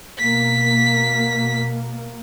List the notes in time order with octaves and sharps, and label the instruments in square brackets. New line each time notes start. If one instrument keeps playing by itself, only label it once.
[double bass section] B2 A#3 [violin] B6